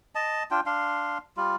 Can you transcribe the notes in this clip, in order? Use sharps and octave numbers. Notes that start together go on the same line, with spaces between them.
D#5 A5
D4 F4 G5
D4 F5 C6
G3 F4